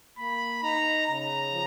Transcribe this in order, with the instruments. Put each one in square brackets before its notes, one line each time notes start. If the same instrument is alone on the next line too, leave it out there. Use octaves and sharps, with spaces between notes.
[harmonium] A#3 [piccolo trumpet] B5
[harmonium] D#4 [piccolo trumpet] A#5
[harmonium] C#3 [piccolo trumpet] A#5
[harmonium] F3